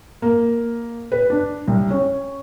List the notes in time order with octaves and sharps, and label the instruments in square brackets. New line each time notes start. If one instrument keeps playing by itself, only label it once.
[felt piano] A#3
B4
D4
C2
C#4